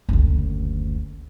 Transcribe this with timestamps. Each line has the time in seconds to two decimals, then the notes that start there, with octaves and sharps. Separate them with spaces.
0.09 F#1 D2